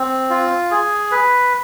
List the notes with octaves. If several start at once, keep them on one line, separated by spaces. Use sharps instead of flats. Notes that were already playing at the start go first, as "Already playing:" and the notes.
Already playing: C4
F4
G#4
B4